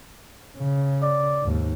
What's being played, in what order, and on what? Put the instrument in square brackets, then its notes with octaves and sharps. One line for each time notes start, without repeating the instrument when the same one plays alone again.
[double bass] C#3
[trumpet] D5
[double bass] D#2 G#2